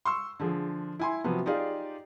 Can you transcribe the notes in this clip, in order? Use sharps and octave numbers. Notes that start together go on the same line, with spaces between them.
C6 C#6 E6
D3 F3 G#4
E4 G#5 C6
C3 F3 F#3 B3
D#4 F4 G4 G#4 D5 F5